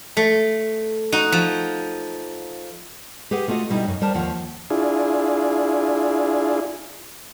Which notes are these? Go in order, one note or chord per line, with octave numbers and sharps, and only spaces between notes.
A3
D#4 F#4
F3
G4 G#4 B4 F#5
A3 F4 F#4 G#4 D#5
B2 G3 D#4 E4 F#4
F#2
G3 A#4 C5 A5
D#2 F3 F#5
D4 E4 F4 G#4